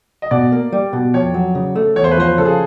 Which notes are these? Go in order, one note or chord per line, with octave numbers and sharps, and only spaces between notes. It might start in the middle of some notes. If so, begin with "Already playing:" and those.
D#5
B2 D5
A#3
G3
B2
F2 C#5
F#3
C#3
A3
E2 C#5
C5
B4
F3 C5
C#3 A4
G#4